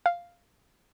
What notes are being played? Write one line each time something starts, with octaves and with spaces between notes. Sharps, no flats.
F5